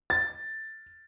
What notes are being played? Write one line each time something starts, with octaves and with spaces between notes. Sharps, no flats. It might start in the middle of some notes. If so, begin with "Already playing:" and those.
A6